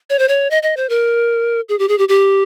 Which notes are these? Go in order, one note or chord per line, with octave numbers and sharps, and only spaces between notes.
C#5
C5
C#5
D#5
D#5
C5
A#4
G#4
G4
G#4
G4
G4